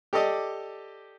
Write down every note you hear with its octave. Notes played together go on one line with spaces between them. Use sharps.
G4 A4 D5 D#5